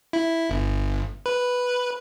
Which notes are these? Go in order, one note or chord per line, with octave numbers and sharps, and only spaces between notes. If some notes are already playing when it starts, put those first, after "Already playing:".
E4
G1
B4